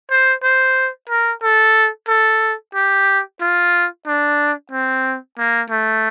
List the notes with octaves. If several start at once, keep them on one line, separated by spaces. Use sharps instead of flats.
C5
C5
A#4
A4
A4
G4
F4
D4
C4
A#3
A3